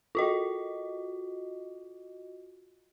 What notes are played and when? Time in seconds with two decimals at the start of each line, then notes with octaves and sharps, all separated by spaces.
0.15 F4 F#4 D#5